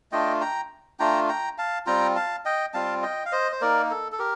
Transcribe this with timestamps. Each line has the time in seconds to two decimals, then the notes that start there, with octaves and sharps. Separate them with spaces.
0.12 A3 D4 F4 D#5 G5
0.41 G5 A#5
0.99 A3 D4 F4 G5 A#5
1.29 G5 A#5
1.58 F5 A5
1.86 G3 C4 F4 G5 A#5
2.15 F5 A5
2.45 D#5 G5
2.74 G3 C4 F4 F5 A5
3.03 D#5 G5
3.26 F5
3.32 C5 D#5
3.52 C5
3.61 A#3 D#4 A#4 D5
3.91 A4
4.12 A4
4.19 G4 A#4